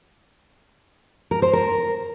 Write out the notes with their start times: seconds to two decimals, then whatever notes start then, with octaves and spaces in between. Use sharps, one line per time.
1.31 A#4
1.42 C5
1.53 A#4